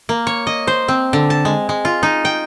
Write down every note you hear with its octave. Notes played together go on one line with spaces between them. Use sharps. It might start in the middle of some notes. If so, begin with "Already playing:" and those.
A#3
C#5
D#5
C5
C4
D3
A5
G#3
G#3
F4
D#4
G5